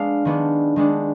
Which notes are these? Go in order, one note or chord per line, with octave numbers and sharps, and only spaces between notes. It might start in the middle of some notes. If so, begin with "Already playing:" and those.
Already playing: G#3 B3 D4 F5
D#3 G#3 B3 D4
D#3 G#3 B3 D4